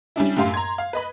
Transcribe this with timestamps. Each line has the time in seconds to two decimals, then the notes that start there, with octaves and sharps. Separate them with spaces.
0.16 G3 C#4 D4 E4
0.37 F#2 A2 G4 F5 C6
0.54 A#5 C6 G#6
0.78 F5
0.93 B4 D#5 B5